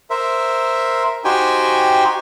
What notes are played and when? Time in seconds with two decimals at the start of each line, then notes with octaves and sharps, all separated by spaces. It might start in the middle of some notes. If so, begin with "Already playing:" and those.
0.10 A#4 C5 E5
1.25 D#4 F#4 G4 C5 G5 G#5